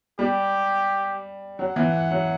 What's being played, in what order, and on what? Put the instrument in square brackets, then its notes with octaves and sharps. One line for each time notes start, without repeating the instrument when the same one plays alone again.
[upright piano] G3 [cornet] G4
[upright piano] F#3 [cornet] F#5
[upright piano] E3
F#3